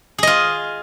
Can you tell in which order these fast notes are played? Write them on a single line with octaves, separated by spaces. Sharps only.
G#4 D#5 F4